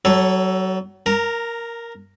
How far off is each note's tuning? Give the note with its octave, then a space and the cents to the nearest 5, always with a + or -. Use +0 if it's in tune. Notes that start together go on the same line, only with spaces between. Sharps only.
F#3 +30 A4 +0 C#5 -10
A#4 +0 A#5 -25